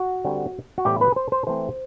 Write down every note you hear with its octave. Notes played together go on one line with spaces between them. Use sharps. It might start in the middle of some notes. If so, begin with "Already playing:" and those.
Already playing: F#4
D3 G3 C4
F#4
A2 E3 G3 B3 G4
B4
C5
C5
E3 A3 C4 C5